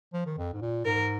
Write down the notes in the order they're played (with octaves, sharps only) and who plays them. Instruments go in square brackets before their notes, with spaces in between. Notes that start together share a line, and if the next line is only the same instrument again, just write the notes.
[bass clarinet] F3
D#3
F2
G#2
A#2
[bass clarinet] G#2 [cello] A#4